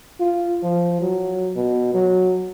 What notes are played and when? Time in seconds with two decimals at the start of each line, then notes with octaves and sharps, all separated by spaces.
0.20 F4
0.63 F3
1.01 F#3
1.56 B2
1.94 F#3